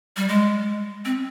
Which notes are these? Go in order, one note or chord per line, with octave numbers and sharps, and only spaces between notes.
G3
G#3
C4